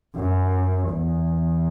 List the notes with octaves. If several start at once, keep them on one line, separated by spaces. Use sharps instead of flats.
F#2
E2